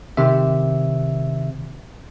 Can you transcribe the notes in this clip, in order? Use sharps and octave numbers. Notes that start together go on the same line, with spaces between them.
C3 D#3 E5